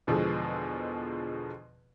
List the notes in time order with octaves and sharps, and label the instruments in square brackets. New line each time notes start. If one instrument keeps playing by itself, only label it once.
[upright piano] E2 B2 D3 F3 G#3